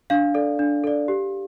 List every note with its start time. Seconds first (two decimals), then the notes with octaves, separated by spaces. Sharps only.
0.10 D4 F5
0.34 A4 D5
0.59 D4
0.84 A4 D5
1.08 G4